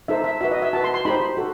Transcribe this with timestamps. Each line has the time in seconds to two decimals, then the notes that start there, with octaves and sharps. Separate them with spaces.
0.08 D#4 A4 C5 E5
0.24 E5
0.41 F#4 B4 E5
0.51 D#5
0.62 E5
0.73 F#4 A5
0.76 B4
0.84 C6
0.94 C6
1.05 D#4 G4 C5 B5
1.37 F#4 A4